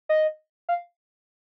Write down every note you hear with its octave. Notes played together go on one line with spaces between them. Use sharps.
D#5
F5